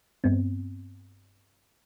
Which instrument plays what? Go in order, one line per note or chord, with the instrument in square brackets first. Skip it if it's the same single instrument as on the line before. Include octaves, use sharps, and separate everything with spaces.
[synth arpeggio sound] G2 B3 C4